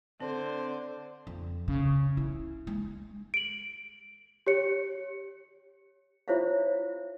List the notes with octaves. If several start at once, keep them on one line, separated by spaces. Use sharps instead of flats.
D3 C4 C5
F2
C#3
E4
G#3
D7 F#7
G4 C#5 C#7
E4 F4 C5 C#5 E5 F5